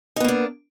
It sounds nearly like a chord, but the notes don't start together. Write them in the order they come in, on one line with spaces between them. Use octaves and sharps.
D#4 B3 A#3 D4